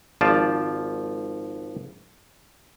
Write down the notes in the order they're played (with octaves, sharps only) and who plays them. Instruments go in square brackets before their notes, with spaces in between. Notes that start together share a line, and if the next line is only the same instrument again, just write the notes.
[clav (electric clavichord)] G#1 F3 F4 D5 A5